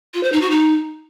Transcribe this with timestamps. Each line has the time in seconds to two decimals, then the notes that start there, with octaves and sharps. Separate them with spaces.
0.14 F4
0.23 C5
0.32 D#4
0.41 F#4
0.50 D#4